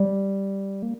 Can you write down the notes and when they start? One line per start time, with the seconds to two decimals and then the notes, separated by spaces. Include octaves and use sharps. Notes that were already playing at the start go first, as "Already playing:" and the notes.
Already playing: G3
0.82 A#3